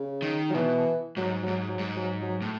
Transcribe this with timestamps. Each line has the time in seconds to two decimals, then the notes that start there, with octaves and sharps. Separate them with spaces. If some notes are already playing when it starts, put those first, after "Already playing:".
Already playing: C#3
0.22 D#3
0.50 F#3
0.54 B2 E3
1.17 G#2 F#3
1.43 F#3
1.48 G#2
1.69 F#3
1.79 G#2
1.96 F#3
2.22 F#3
2.42 A2